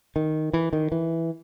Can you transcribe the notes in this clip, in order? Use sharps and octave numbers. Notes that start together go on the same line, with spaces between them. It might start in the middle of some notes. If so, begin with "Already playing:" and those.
D#3
E3
D#3
E3